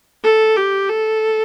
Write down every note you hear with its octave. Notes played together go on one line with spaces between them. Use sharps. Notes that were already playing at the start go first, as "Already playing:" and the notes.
A4
G4
A4